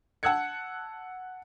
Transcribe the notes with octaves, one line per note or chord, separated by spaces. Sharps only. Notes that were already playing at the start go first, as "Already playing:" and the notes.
F#5 A5 E6 F#6 G#6 C#7